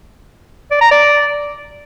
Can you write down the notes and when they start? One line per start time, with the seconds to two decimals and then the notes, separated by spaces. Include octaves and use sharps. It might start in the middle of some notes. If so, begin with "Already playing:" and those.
0.71 D5
0.81 A#5
0.91 D5